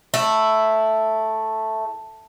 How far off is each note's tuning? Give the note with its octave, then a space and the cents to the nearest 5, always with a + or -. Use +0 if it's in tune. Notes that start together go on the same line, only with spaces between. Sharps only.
A3 +0 E4 +0